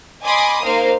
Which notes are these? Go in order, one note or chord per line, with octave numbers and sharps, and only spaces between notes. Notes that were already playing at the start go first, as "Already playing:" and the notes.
D#5 G#5 B5 C6 D6 D#6
A#3 D#4 A#4 C5 F5